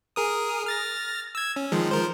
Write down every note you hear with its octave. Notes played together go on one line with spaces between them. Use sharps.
G#4 A#4 D#6
F6 A6 A#6
E6 G#6
C#4
D#3 F3 G#3
F3 A#4 C5